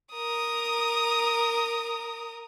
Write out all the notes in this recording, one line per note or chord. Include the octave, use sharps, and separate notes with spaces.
A#4 D#6